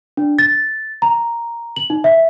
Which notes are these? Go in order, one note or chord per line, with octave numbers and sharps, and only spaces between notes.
D4
A6
A#5
F#7
D#4
E5